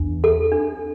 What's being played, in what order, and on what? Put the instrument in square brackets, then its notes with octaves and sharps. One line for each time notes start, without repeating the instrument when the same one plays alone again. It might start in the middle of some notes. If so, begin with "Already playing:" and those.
Already playing: [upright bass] E2 [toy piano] D4
[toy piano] A4
D4